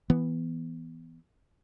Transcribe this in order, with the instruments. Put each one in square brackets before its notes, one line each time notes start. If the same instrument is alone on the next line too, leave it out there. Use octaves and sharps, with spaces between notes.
[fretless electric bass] E3 B3